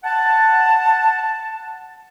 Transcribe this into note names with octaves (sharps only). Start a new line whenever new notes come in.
F#5 A5